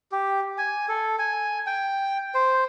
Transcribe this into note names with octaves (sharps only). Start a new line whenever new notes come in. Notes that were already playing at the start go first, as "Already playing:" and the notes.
G4
G#5
A4
G#5
G5
C5